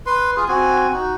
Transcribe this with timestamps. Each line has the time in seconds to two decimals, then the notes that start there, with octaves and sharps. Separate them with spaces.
0.06 B4 C6
0.37 F4 G#4
0.48 C4 F#4 G#5
0.93 D#4 F#4